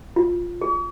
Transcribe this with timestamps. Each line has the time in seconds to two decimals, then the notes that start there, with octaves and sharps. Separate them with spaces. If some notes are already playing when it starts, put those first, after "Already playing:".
0.16 F4
0.61 G#4